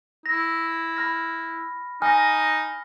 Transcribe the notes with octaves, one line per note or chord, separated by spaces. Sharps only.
E4 A#6
B5 F6 A#6
D#4 G#5 F6 A#6